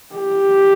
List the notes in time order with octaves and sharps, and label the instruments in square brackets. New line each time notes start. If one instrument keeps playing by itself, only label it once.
[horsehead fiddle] G4